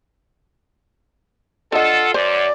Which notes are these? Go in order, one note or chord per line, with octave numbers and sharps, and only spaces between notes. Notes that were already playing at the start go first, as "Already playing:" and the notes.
D3 F4 A4 D#5 F#5
F#2 C5 D5